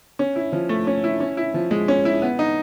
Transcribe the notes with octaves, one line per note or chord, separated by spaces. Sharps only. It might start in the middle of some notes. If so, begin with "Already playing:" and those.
C#4
E4
F3
A3
C#4
E4
C#4
E4
F3
G#3
C#4
E4
B3
D#4